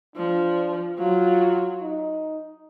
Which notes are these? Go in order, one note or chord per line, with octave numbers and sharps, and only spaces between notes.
F3 D4
F#3 F4
D#4